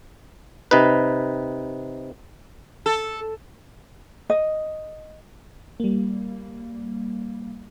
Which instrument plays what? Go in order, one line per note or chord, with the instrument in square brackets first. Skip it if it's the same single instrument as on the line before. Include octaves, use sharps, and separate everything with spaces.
[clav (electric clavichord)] C3 D#4 B4
[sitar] A4
[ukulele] D#5
[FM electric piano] G3 A#3